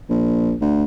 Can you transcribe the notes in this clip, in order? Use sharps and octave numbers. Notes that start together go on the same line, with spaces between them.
A#1
D2